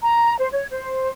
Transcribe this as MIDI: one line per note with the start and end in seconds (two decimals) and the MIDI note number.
0.02 0.34 82
0.39 0.49 72
0.52 0.66 73
0.71 1.10 72